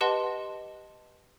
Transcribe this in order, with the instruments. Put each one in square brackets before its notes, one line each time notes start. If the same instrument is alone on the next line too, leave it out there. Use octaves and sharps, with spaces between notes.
[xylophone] G4 B4 D#5 F#5 A5 C6